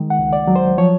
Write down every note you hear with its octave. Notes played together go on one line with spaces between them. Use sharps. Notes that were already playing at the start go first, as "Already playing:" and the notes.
Already playing: D#3 G#3
F#5
C#2
D5
F#3
C5
F3 C#5